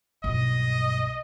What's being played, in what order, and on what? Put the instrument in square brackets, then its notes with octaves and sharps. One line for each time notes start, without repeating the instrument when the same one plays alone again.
[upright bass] B1 G2 [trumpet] D#5